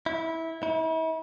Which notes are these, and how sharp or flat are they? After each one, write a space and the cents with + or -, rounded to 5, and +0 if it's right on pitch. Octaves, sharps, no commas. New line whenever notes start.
E4 -15
E4 -40